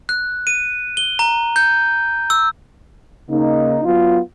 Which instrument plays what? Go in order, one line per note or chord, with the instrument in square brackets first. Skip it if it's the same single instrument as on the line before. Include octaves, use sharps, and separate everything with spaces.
[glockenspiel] F#6
D#7
G7
A#5
G6
E6
[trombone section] C#3 A#3 D#4
F#3 B3 F4